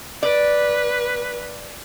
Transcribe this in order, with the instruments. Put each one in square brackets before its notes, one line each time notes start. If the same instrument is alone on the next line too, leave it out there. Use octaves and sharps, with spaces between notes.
[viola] B4 [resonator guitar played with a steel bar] D5